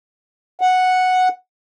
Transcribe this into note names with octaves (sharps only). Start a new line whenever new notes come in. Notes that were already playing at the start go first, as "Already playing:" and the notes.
F#5